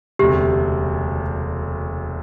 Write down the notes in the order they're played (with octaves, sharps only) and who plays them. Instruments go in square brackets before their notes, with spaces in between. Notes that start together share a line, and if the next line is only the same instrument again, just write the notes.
[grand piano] E1 D2 C3 [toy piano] G4